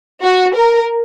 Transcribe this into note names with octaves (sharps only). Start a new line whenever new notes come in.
F#4
A#4